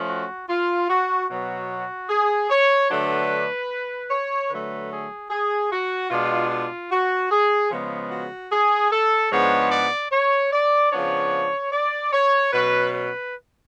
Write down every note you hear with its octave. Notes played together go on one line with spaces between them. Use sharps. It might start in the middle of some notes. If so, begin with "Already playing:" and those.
Already playing: F3 A3 C#4
F#4
F4
F#4
B2 F#3 B3 F#4
G#4
C#5
D3 F#3 A3 D4 B4
C#5
D3 F#3 A3 B4
G#4
G#4
F#4
B2 G#3 D4 F4
F4
F#4
G#4
C#3 F3 G#3 B3
F#4
G#4
A4
G#2 F3 G#3 B3 D4 C#5
D5
C#5
D5
C#3 F3 B3 D4 C#5
D5
C#5
B2 F#3 C#4 B4
B4